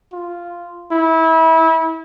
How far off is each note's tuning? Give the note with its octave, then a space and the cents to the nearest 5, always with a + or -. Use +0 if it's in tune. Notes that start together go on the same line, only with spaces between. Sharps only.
F4 -5
E4 -25